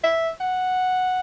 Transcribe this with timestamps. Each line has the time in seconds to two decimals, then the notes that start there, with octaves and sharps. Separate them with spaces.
0.04 E5
0.40 F#5